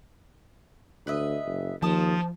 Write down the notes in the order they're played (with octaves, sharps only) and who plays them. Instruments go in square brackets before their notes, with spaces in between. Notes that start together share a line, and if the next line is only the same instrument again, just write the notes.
[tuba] D2 [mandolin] B4 D#5 E5
[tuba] F#1
[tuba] D#2 [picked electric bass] F3 [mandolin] A5 D#6